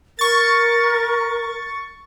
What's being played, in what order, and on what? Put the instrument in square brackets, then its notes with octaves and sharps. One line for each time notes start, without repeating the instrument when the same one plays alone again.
[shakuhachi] A#4 [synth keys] C#6 A6